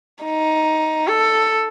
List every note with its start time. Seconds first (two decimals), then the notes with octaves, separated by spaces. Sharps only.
0.23 D#4
1.08 A4